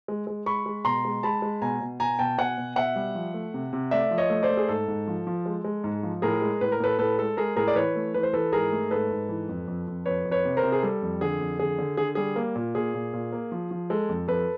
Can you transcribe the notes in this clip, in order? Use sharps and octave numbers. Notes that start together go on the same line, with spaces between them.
G#3
G#3
G#3 B5 C#6
G#3
B2 A#5 C6
G#3
G#3 A5 B5
G#3
B2 G#5 A#5
B2
B2 G#5 A#5
B2 G5 A5
B2 F#5 G#5
B2
B2 E5 F#5
G3
F3
A3
C3
C3
A3 D5 E5
F3
C#5 D#5
A3
C5 D5
A3
G#4
G#2 A4
G#2
F3
F3
G#3
G#3
G#2
F3
A2 G#4 A#4
G#3
A2 B4
A#4
A2 A4 B4
A2 A4 B4
G#3 A4
G#3 G#4 A#4
A2 G#4 A#4
D5
E3 B4 C#5
A3
E3 B4
C5
E3 A4 B4
G#2 G#4 A#4
A3
G#2 A4 B4
G#2
E3
F2
F2
F2
F2 B4 C#5
F2
B4 C#5
C3
A#4 C5
C3
G#4
G3 A4
F2
D3 G#4
F2
D3 G#4
D3
D3 G#4
G3 G#4
A#3
A#2
A#2 G#4
A#2
A#2
A#3
F3
F3
G#3 A4
F2
F2 A4 B4